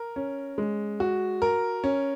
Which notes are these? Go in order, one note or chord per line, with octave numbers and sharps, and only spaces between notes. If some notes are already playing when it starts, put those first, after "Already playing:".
Already playing: A#4
C#4
G#3
F#4
A#4
C#4